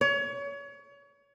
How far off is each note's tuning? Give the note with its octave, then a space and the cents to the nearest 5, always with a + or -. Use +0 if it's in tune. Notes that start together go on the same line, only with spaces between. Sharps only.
C#5 +30